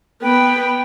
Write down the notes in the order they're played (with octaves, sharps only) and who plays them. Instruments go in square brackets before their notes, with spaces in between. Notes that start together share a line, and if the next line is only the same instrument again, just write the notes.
[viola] B3 B4 [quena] G5